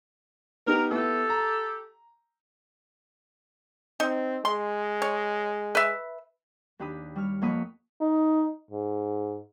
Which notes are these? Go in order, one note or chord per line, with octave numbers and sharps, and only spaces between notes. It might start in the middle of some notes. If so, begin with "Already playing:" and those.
B3 D#4 G4 A#4
B3 E4 G4 A4
A#5
C4 D#4
G#3 C6
C#5
B4 E5
D#2 D4 G4 B5 D#6
G3 C#5 F6
F2 A#3 C#5 F#5 B5 D#6
D#4
G#2